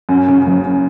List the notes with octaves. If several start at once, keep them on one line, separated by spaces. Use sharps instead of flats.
F#2
C#3
F#1